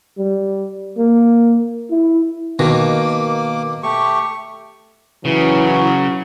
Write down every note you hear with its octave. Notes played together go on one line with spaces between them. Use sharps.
G3
A#3
E4
B2 D#3 A#3 D6
A3 G4 C#6
C#3 E3 F#3 E4